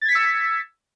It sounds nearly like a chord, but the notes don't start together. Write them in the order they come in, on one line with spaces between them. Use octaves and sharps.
A6 G#6 B6 C#7 E6